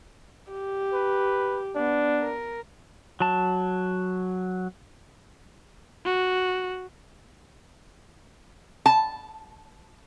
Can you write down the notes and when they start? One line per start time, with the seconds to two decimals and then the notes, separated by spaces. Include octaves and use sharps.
0.52 G4
0.94 B4
1.76 B3 D4
2.21 A#4
3.20 F#3 A5
6.05 F#4
8.86 A5